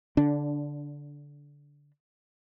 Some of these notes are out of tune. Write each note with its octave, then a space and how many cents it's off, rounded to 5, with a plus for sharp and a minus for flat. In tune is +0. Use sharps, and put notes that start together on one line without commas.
D3 -20 D4 +0